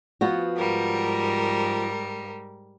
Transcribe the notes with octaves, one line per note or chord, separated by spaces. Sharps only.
F3 B3 F#4
G#2 G3 A#4